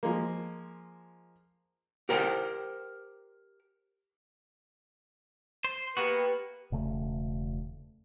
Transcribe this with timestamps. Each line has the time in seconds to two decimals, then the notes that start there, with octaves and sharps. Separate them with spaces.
0.03 F3 G#3 A#3
2.09 G4 A#4 C5 G5
5.64 C5
5.97 A#3 B3 F#4 G4 B4
6.72 E1 C#3 A3